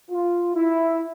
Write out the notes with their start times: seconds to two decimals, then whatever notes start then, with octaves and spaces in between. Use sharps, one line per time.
0.11 F4
0.56 E4